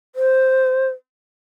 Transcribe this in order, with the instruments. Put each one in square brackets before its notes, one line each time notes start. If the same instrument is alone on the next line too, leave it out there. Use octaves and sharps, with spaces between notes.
[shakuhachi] C5